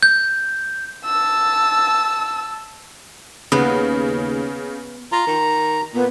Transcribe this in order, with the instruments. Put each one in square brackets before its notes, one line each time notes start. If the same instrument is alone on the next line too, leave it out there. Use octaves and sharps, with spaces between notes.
[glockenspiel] G6
[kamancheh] A5 E6
[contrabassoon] D#2 [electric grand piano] C#3 [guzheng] B3
[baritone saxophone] F4 [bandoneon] A#5
[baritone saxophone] D#3
[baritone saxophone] A#2 [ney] B3